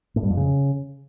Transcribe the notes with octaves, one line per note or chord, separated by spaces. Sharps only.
A2
G2
F2
C#3